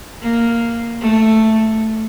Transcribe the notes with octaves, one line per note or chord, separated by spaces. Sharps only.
A#3
A3